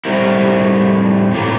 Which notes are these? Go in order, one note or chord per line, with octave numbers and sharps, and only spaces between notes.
A2 G3 C4 E4 A#4
A2 E3 A#3 F4